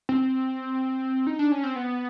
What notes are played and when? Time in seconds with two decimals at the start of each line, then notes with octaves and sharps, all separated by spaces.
0.09 C4
1.27 D#4
1.39 D4
1.52 C#4
1.64 C4
1.76 B3